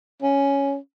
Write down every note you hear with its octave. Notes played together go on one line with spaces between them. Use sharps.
C#4